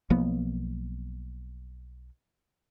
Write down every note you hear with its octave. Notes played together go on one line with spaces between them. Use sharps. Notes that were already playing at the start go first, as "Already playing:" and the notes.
B1 F3 A#3 B3